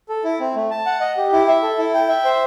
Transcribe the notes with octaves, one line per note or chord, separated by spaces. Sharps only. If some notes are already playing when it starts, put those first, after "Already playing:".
A4
E4
C4
A3
A5
F#5
D#5
G4
E4
E5
A4
E4
G5
E5
C5